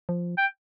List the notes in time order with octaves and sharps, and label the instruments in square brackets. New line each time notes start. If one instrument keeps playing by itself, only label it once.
[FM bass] F3
[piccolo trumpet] G5